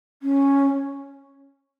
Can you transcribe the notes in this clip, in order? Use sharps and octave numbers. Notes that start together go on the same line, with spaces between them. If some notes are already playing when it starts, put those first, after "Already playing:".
C#4